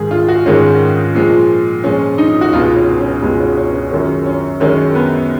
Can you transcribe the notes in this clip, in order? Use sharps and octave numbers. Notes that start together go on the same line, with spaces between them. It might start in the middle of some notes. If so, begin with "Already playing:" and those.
Already playing: G#2 D#3 G#3 G#4
F4
F#4
G#2 D#3 G#3 C#4
A#2 F3 G#3
A#2 F3 G#3 C#4
D#4
F#4
C#2 B2 G#3 F4
C#4
C#4
C#2 B2 G#3
C#4
C#4
C#4
F#2 D#3 G#3 C#4
C#4
F#2 D#3 G#3 C#4
B3